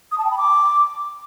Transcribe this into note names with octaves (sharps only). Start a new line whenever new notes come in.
D#6
A5
G5
B5
D6